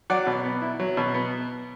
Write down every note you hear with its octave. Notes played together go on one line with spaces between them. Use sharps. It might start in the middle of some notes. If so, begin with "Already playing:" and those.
F#3 D5 F#5
B2
B3
E4
F#3
B2
B3